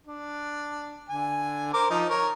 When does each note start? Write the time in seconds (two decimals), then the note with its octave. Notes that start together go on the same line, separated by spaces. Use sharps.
0.06 D4
1.09 D3 G#5
1.73 A#4 C5 D6
1.90 F3 D#4
2.09 A#4 C#5